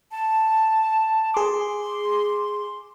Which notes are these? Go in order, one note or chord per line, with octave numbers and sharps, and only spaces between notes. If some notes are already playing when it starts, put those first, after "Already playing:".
A5
G#4 C6 D6